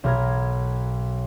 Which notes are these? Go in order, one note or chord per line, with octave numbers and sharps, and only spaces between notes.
B1 A#4 G#6